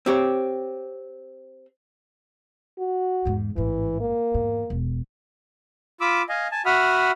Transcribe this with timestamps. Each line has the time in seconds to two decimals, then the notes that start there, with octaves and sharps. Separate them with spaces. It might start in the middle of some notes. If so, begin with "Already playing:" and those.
0.06 C4 G4 C#5
2.78 F#4
3.25 E2 G#2
3.56 A1 G#2 E3
4.00 A#3
4.34 E2 G#2
4.70 E1
6.01 F4 B5 D6 E6
6.29 D#5 F5 G#5
6.52 G#5 A5
6.66 F#4 E5 F#5 B5 D#6 F6